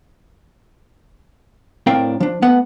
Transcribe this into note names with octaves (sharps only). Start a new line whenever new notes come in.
A2 C4 D4 A#4 F5 G5
F3 D4
A3 B3 B4 F#5